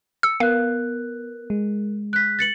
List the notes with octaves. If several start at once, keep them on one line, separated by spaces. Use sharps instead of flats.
E6 C#7
B3 A#4 F5 F#6
G#3
F#6 B6
A6 C#7 F#7